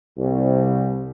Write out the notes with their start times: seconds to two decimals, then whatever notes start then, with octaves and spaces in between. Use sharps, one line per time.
0.18 C2